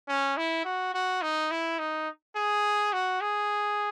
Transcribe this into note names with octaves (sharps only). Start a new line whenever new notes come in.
C#4
E4
F#4
F#4
D#4
E4
D#4
G#4
F#4
G#4